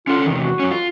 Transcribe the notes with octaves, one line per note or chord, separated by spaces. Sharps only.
C#4 F4 A4 F#5
E2 C3 D#3
F#4
F#2 C#4
F4